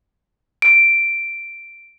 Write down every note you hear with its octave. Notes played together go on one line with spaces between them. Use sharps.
D7